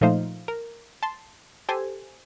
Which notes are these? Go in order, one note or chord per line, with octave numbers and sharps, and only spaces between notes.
A#2 F3 A3 D#4 C5 F5
A#4
A5 C6
G4 A4 C5 G#5